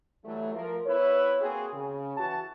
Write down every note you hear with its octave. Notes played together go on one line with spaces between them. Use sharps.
E3 F#3 G3 A3
F3 A#4
B3 E4 B4 C#5
A#3 C4 F#4 G#4
C#3
E3 F#4 A5